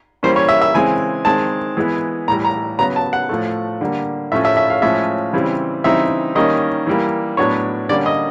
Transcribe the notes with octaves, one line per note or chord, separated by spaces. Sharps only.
E3 G3 A#3 C#4 C5
C#5
E5
E5
C#3 E3 G#3 C4 G#5
D#3 G#3 C4 A5
E3 G#3 B3
A2 E3 G3 A#5
A#5
C#3 F#3 B3 A#5
A5
F#5
A2 F3 A3
D3 G3 A#3
A2 F3 A3 C#4 E5
E5
E5
F5
A2 F3 G#3 C#4 E5
C#3 E3 G3 C4
C#3 E3 G3 C4 D#4 E5
D#3 G3 A#3 C#4 D#5
E3 G3 A#3
A2 F#3 B3 D4 C#5
D3 G3 A#3 C#4 D5
D#5